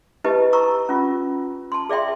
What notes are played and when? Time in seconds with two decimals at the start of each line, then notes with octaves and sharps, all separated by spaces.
0.24 E4 G4 B4 D#5 A5
0.53 A#5 C#6 E6
0.89 C#4 F4
1.72 A5 C6
1.89 G#4 D5 E5 G5 C6